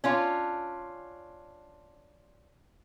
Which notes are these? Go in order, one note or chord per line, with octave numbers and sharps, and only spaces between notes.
C#4 D4 F4